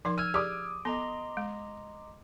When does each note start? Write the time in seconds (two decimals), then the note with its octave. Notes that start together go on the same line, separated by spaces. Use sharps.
0.05 F3 D#4 A#4 C6
0.18 E6 F6 G#6 D#7
0.34 G4 G#4 D5 D6 D#6
0.85 B3 A4 D#5 A#5 C6
1.37 G#3